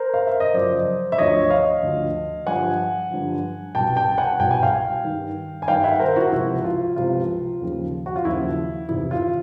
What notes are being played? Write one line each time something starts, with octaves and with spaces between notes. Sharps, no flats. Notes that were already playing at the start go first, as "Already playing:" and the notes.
Already playing: A#4 C5
F5
E5
D#5
F#2 C#3 F3 C5 D5
E5
D2 D3 F3 C#5 D#5
D#5 F5
D2 D3 F3
G2 D3 F3 F#5 G#5
G2 D3 F3
C2 B2 G5 A5
G5 A5
F#5 G#5
C2 B2 G5
G#5
F5 G5
G2 D#3
G#5
G2 D#3 F5 G5
E5 F#5
A#4 C5
E4 F#4
C#2 C3 F3 E4
F4
C#2 C3 F3 F4
D#2 C#3 F3
F#4
F4
D#2 C#3 F3 E4
E2 C3 D#3 E4
F4